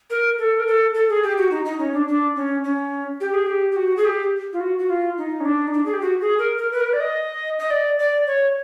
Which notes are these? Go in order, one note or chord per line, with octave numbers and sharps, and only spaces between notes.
A#4
A4
A#4
A4
A4
G#4
G4
F#4
D#4
D#4
C#4
D4
D4
C#4
C#4
G4
G#4
G4
G4
F#4
G#4
G4
F4
F#4
F#4
F4
D#4
C#4
D4
D#4
D4
G#4
G4
F#4
G#4
A#4
A#4
B4
A#4
B4
D5
D#5
D#5
D5
D5
C#5